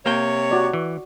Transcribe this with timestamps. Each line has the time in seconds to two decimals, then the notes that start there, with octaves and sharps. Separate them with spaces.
0.06 C3 A#3 C#5 G5
0.51 F#4 D5
0.73 E3